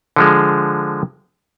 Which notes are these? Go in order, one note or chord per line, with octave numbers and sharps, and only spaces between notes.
D3 F3 G#3